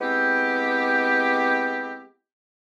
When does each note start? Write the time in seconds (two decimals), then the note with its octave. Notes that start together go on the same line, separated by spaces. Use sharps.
0.01 G#3 B3 C4 E4 G4